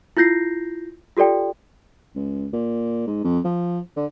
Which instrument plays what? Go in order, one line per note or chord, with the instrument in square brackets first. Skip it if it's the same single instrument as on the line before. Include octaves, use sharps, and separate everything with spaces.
[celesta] E4 F4 G6 A#6 C7
F4 G4 A4 D5 G5
[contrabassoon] C#2
A#2
G#2
F2
F3
D3